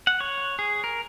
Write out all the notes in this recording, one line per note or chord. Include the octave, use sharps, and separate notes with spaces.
F#5
C#5
G#4
A#4